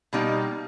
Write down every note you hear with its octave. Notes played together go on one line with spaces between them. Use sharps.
B2 G3 A#3 D#4